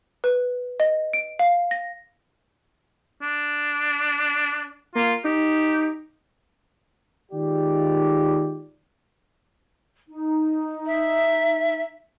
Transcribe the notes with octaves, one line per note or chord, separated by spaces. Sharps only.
B4
D#5
D7
F5
A#6
D4
A#3 F4
D#4 G4
D#3 G#3 F4 G4 D5
D#4
E5